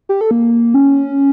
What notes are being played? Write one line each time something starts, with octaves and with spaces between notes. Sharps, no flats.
G4
A4
A#3
C#4